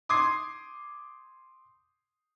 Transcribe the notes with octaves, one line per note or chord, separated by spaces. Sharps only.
C6 D6 D#6 G#6 C7